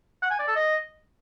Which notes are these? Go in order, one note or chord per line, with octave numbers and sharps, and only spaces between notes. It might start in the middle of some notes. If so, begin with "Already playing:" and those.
F#5
G#5
D5
A4
D#5